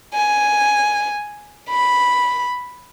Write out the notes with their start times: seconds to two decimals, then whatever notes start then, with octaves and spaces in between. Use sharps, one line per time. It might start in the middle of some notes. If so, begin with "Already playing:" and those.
0.14 G#5
1.69 B5